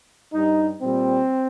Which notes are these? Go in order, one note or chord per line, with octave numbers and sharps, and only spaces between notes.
G2 G3 D#4
A#2 G3 C4